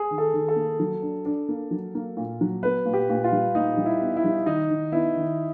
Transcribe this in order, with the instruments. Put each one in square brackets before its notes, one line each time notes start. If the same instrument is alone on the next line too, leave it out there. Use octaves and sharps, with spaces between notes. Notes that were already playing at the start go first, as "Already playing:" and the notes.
Already playing: [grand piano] G#4
[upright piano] D#3
[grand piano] A4
[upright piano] D#3
[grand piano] A4
[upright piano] A#3
F#3
D4
D4
A#3
F#3
A#3
A#2
F#3
[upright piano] B3 [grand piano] B4
[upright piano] A#2
[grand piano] G4
[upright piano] A#2
[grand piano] F4
[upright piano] G3
[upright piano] A#2 [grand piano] D#4
[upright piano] G3
[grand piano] E4
[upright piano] B3
[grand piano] E4
[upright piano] G3
[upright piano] D#3 [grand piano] D#4
[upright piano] D#3
[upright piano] B3 [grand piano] E4
[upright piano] D#3